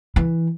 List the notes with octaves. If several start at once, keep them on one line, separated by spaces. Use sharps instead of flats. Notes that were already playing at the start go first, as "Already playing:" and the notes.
E3